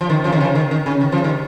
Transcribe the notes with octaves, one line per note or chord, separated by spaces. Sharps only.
F3
D#3
C#3 F3
D#3
C#3 F3
D#3
D#3
C#3
D#3
C#3 F3
D#3 G3